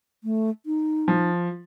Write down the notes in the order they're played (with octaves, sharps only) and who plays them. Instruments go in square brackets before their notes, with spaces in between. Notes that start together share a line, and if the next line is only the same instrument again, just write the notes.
[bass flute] A3
D#4
[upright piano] F3